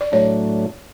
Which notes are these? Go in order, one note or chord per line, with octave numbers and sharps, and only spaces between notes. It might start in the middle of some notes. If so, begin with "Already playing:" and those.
D5
A2 F#3 A3 D4 C#5